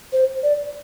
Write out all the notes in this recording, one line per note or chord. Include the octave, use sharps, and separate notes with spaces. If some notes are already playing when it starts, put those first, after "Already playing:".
C5
D5